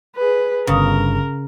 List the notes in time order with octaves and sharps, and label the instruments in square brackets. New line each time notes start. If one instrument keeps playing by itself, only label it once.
[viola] G#4 B4
[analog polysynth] G1 [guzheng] C#3 [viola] A#4